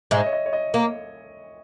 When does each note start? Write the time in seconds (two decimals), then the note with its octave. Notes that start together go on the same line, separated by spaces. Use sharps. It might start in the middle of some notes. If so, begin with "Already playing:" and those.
0.11 G#2 G#3 E5
0.18 D#5
0.26 C#5
0.33 D#5
0.46 C#5
0.53 D#5
0.74 A#3